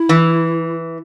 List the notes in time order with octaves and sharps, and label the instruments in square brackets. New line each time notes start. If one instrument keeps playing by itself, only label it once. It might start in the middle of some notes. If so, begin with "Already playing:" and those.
Already playing: [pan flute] E4
[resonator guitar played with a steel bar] E3